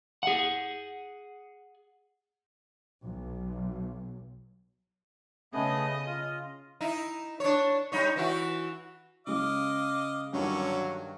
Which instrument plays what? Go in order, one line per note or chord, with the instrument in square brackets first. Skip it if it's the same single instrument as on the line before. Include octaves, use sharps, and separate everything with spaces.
[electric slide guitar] G#4 F#5
[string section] B1
[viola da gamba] C#3 D#5 [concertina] A3 B3 G#4
[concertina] F4
[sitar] D#4 E4
D4 C#5
G3 D#4 C#5
E3 E4 F#4
[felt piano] C#3 G#3 [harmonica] D#5 F5 D6
[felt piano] G2 D#3 [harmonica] D3 C#4 [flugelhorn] F#3